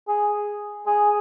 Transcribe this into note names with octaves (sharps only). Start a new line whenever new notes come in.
G#4
G#4